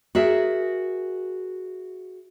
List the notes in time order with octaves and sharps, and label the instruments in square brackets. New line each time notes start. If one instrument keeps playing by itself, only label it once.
[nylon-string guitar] F#4 G#4 A#4 E5